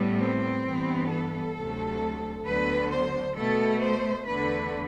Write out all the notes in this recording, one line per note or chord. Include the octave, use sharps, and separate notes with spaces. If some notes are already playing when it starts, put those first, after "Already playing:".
Already playing: A2 G3 B3
C4
G2 E3 B3
A4
D2 C3 F#3 A3
D2 D3 F#3 B3 B4
C5
B2 A3 A4
C5
E2 D3 A3 B4